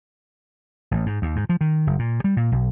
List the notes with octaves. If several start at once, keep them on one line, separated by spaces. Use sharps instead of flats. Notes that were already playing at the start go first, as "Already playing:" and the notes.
A1
G#2
D#2
G#2
F3
D#3
F#1
A#2
G3
A#2
B1